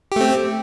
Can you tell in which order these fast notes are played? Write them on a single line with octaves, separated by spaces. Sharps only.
G4 A3 C4